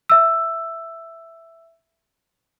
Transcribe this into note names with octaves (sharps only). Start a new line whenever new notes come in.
E5 E6